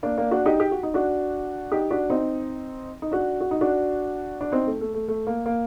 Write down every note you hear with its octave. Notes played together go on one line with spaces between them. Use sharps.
A#3 D4
A#3 D4
D4 F#4
D#4 G4
G4
F#4
D#4
D4 F#4
D#4 G4
D4 F#4
C4 D#4
D#4
D4 F#4
F#4
D#4
D4 F#4
D4
C4 D#4
A3
A3
A3
A3
A#3
A#3